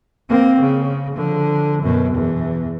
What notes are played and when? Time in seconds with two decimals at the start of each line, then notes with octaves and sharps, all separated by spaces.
0.29 A#3 C4
0.61 C#3
1.12 D3 F3
1.82 F#2 B2
2.14 E2